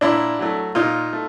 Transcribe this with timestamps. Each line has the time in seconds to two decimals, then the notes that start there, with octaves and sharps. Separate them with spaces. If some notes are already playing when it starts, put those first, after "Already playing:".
0.01 A#2 D4 E4
0.39 F#3 A3
0.75 A#2 D#4 F4
1.13 A3